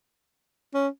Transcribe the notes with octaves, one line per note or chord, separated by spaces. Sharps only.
C#4